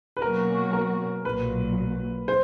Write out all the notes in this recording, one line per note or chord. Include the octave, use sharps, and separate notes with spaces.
B4
B2 F#3 A#3 C#4 F#4 A#4
A#4
B1 A#2 F#3 B4
C5